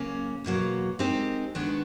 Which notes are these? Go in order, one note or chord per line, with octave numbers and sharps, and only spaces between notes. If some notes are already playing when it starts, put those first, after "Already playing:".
Already playing: C#3 F#3 A#3 C#4
E2 B2 F#3 A#3
G#3 C4 D#4 G4 A#4
D#3 G#3 B3 D4 F#4